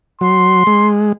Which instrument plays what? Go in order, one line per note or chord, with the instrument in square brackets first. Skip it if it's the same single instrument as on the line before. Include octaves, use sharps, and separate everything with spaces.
[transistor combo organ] F#3 [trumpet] C6
[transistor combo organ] G#3